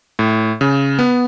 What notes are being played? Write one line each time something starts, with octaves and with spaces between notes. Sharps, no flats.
A2
C#3
B3